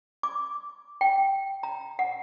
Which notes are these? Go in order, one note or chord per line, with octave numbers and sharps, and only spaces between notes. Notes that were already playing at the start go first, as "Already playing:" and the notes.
D6
G5
A#5
F#5